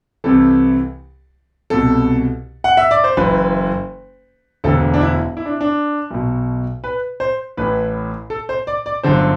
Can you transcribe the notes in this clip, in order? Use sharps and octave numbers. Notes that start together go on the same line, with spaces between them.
C2 C3 E3 A4
C2 B2 A4
F#5
E5
D5
C5
F#1 F#2 E3 B4
E1 D2 D3 A4
D4
E4
E4
D4
D4
B1 B2
B4
C5
A1 A2 E3 B4
A4
C5
D5
D5
G1 F#2 D3 C5